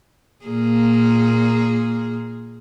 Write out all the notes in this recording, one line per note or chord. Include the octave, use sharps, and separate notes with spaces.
A#2 A#3 G#4